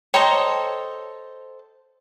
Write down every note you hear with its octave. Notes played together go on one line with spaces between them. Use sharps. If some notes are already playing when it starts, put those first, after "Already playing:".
A4 C5 C#5 D#5 G5 A#5